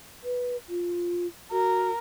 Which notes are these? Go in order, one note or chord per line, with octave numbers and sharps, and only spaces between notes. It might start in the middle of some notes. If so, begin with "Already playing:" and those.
B4
F4
F#4 A#4